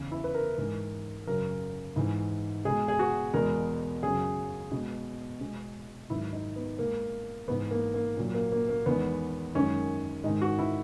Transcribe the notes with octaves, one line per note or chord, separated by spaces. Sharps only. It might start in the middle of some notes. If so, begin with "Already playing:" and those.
Already playing: E2 C#3 E3
E4
B4
A#4
G#2 E3 G#3 A#4
F#2 C#3 F#3 A#4
G#2 E3 G#3
B2 G#3 G#4
G#4
F#4
E2 B2 G#3 A#4
F#2 C#3 F#3 G#4
B2 G#3
B2 G#3
G#2 D#3 F#3 E4
D#4
B3
B2 G#3 A#3
G#2 E3 G#3 B3
A#3
A#3
A#2 F#3
A#3
A#3
A#3
E2 D#3 G#3 B3
F#2 D#3 G#3 C#4
G#2 D#3 G#3 D#4
F#4
E4